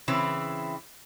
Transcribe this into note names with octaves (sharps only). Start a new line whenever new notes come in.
C#3 E3 C4 E4